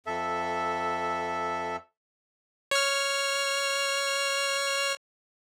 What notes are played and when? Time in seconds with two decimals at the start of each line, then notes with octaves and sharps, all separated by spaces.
0.06 F2 A4 E5
2.71 C#5 F6